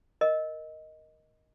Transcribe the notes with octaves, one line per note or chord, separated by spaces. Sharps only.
A#4 D#5